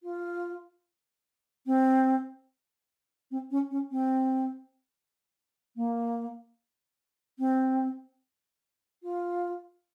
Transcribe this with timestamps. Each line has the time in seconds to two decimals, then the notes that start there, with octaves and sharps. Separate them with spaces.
0.03 F4
1.66 C4
3.31 C4
3.51 C#4
3.71 C#4
3.91 C4
5.76 A#3
7.39 C4
9.03 F4